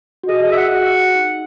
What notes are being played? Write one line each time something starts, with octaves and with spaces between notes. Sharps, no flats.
F#4
G#4 D#5
D#5
G#4 E5
F#5
F#4
D#4